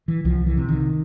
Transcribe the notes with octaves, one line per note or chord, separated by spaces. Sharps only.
E3
C2 F3
E3
C3
D#3